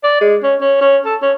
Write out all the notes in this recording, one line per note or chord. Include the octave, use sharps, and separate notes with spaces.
D5
G#3
C#4
C#4
C#4
A4
C#4